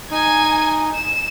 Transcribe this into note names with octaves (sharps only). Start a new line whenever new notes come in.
D#4 G#5 G#6
E7